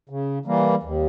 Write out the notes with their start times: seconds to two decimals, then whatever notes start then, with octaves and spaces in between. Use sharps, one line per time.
0.09 C#3
0.46 E3 G3 A#3
0.83 D#2